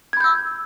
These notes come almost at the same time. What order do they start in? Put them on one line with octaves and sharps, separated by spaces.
G#6 B5 G6 E6